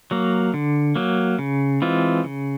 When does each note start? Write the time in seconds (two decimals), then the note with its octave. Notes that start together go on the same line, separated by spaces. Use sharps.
0.11 F#3 A#3
0.54 D3
0.96 F#3 A#3
1.39 C#3
1.82 E3 G#3 C4 F4
2.24 C#3